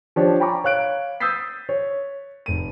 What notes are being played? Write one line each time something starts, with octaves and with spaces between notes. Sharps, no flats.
F3 D4 G4 C#5
G5 G#5 A#5 B5 C#6 D6
C#5 F5 F#6 D7
D#6 E6 G6 A6 B6 C7
C#5
F1 D#7